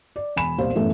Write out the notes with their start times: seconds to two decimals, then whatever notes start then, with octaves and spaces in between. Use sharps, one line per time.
0.16 D5
0.36 E1 G#5 B5 E7
0.58 E1 C2 A#2 C5 F5
0.75 F#2 A2 E3 A3 B3 E4